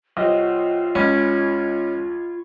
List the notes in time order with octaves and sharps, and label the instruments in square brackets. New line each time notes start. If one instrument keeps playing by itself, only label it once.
[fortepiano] C2 [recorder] F4 [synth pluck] C#5 D#5 F#5
[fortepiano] C#2 [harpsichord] C#4 [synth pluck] B5 C#6 G#6